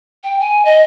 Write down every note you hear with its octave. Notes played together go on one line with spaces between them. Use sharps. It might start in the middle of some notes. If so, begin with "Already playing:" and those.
G5
G#5
D#5